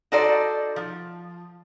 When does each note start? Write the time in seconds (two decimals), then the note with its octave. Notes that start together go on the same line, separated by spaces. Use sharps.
0.12 D#4 F#4 A4 C5 D5
0.76 F3